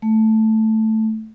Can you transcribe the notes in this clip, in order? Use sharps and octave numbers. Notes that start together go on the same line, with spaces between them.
A3